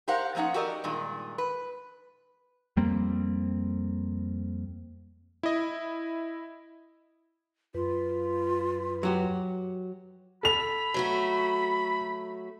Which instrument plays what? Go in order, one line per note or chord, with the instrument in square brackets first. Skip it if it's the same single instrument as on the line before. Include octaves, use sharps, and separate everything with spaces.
[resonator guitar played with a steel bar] G4 A#4 C5 F5 F#5
F3 A#3 C#4 D#4 F#5
F#4 G4 A4 A#4 D5 D#5
G2 A#2 D#3 G#3
B4
[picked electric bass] F2 G3 A#3 C4
[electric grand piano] E4 D#5
[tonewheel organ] F#2 B4 [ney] F4
[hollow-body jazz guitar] F#3 F#4 G4
[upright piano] A4 F7 [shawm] B5
[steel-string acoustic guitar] F#3 A3 F#4